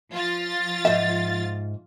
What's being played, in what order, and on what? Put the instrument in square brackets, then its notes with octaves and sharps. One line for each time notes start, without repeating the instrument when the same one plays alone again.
[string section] F3 F4 A6
[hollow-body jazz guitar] G#2 E5